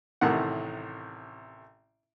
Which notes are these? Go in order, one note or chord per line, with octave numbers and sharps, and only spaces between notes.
A1 A2 C3 D#3 F#5